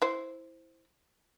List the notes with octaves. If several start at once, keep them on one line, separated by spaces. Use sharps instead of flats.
E4 C5